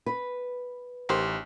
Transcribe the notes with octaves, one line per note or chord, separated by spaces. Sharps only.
B4
A1 D#3 G4 C5